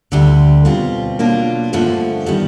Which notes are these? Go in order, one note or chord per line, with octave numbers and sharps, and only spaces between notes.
D2 D3 G3
B2 G3 C4 F4
B2 F#3 A#3 D4 F4
G2 D3 F3 A3 C#4
D#3 G3 B3